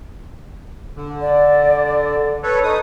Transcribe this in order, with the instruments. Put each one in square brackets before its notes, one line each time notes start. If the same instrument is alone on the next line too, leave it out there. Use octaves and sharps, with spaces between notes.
[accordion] D3
[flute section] D5
[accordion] A4 B4 C#5
D#4 D#6